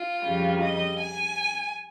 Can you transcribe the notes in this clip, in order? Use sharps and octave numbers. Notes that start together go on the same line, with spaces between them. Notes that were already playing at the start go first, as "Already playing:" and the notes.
Already playing: F4
F2 C#3 G3
D#5
G#5